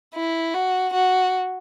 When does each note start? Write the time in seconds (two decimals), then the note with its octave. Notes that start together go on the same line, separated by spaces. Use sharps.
0.15 E4
0.54 F#4
0.94 F#4